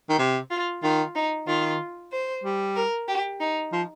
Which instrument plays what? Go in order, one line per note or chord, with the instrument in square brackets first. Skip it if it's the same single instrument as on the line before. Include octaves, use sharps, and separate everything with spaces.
[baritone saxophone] D#3
C3
[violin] F4
[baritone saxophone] D#3 [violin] F4
[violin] D#4
[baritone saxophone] D#3 [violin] F4
[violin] C5
[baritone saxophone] G3
[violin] A#4
G4
D#4
[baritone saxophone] F3